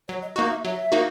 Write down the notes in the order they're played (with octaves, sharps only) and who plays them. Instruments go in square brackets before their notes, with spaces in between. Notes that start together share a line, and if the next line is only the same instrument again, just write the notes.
[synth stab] F#3 [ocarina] C#5
[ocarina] D#5
[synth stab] A#3 D#4 F#4 [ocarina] D#5
[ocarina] E5
[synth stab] F#3 [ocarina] E5
[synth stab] A#3 D#4 F#4